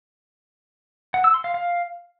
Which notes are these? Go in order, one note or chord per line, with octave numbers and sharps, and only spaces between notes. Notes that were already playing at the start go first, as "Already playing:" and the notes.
F#5
E6
C6
F5
F5